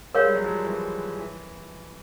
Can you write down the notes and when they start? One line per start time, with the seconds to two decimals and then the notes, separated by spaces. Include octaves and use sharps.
0.14 G#3 A#4 C#5 F5
0.25 G3
0.35 F#3
0.44 F3 G3
0.66 E3 F#3
1.19 E3